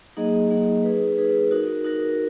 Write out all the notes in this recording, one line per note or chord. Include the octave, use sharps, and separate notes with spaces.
F#3 A#3 D#4 G#4 D#5
F#3 A#3 D#4 G#4 D#5
D#4 G#4 B4
D#4 G#4 B4
D#4 F#4 A#4
D#4 F#4 A#4